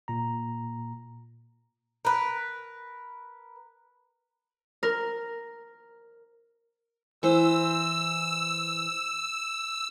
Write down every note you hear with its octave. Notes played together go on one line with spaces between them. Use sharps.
A#2 A#5
A#4 B4
A#4
E3 C5 E6